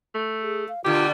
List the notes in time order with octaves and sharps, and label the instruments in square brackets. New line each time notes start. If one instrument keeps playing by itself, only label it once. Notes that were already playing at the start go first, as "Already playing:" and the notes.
[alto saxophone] A3
[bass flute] G#4
F5
[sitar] B2 D3 A#3 [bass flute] F4 [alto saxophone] G4